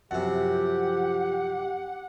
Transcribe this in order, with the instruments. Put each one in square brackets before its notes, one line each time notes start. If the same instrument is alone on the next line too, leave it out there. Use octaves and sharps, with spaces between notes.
[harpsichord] F#2 C3 [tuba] F3 [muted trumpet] G4 [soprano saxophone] F#5